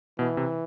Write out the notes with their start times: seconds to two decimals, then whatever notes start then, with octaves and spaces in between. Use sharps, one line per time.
0.19 B2 E3
0.37 C3